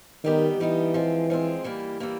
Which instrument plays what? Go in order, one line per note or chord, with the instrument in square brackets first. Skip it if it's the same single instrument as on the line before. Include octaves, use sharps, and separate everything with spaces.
[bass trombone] D#3 [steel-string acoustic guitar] G3 B3 D#4 G4
[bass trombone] E3 [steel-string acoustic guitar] G3 B3 D#4 G4
[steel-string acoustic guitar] F3 G#3 C4
F3 G#3 C4
E3 G3 A#3
E3 G3 A#3